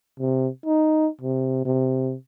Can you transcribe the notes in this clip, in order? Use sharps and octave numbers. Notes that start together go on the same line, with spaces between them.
C3
D#4
C3
C3